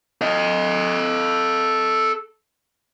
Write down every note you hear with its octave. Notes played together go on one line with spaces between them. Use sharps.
A4 D#5